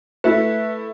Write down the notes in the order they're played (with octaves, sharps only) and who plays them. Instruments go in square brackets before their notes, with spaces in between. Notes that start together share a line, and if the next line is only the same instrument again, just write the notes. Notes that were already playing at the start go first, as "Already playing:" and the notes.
[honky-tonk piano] A3 E4 [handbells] B4 E5